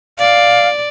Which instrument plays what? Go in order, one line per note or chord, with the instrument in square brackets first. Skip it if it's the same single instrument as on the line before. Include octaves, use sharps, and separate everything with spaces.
[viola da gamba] D5 [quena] F5